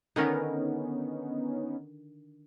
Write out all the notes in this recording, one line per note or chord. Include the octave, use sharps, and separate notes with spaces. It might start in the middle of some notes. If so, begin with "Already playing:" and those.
D3 D#3 B3 C#4 D#4 A#4